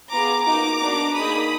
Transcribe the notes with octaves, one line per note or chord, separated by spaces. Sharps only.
B3 F4 G#4 A#5 D6
A#3 D#4 F#4 A#5 D6
B3 D4 F#4
A#3 D#4 G#4 B5 D#6